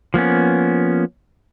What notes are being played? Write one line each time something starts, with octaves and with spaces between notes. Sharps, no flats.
F3 A#3 B3 C#4